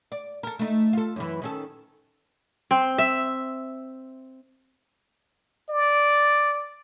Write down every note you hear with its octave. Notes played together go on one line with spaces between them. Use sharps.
D5
A4 A#4
A3 D#4
F4 A4
F#2 E3
D#3 C#4 A4
C4
E5
D5